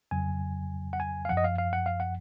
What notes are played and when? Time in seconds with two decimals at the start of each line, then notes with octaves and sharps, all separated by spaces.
0.11 F2 C#3 F#3 G#5
0.93 F#5
1.00 G#5
1.25 F5
1.29 F#2 F3 F#5
1.37 D#5
1.44 F5
1.58 F5
1.73 F#5
1.86 F5
2.00 F#5